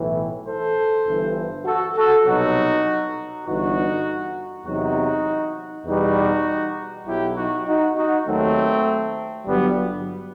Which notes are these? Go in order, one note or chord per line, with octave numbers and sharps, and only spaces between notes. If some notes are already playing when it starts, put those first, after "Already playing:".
Already playing: B1 A2 E3
A4 C5
G1 G2 E3
F#4 A4
F#4 A4
C2 B2 F#3 D#4 F#4
G1 G2 E3 D#4 F#4
E2 C3 F#3 D#4 F#4
E2 B2 G3 D#4 F#4
B1 B2 F#3 E4 G4
D#4 F#4
D#4 F#4
D#4 F#4
D#2 D#3 F#3 A3 C4
G1 G2 F#3 G3 B3